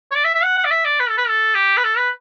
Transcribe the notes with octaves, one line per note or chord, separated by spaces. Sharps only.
C#5
D5
E5
E5
F#5
F#5
D5
E5
D5
B4
A4
B4
A4
G4
B4
A4
B4